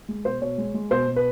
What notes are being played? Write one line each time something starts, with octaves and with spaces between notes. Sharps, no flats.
G#3
B2 C5
B2 C#5
G#3
G#3
B2 C5
B2
B4